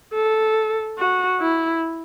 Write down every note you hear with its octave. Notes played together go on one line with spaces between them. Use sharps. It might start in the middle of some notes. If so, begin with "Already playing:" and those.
A4
F#4
E4